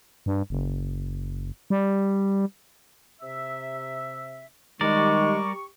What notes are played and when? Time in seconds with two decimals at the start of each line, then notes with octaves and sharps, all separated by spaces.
0.26 G2
0.50 F#1
1.70 G3
3.21 C3 E5
4.81 D#3 G3 G#3 G4 A#4 D5 C#6